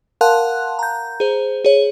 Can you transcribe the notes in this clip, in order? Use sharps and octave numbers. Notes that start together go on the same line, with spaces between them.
A#4 F5 F#5 A5 C6 F#6
A#5 G6
G#4 C5
G#4 C#5